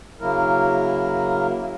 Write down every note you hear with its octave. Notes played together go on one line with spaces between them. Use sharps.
C#3 F#3 A#3 E4 A#4